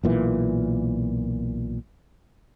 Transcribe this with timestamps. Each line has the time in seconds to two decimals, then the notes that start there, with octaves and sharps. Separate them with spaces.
0.04 B1 A#2 E3